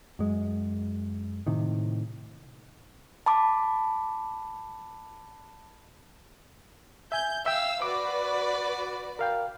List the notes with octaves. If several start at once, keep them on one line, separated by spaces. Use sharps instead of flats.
F#2 G#3
A2 C3 D#3
A5 B5 D6
E5 G#5 G6
E5 F5 G5 E6
F#4 B4 D5 D6
A#4 F5 G5